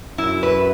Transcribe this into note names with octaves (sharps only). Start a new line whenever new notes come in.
F#2 E4
B4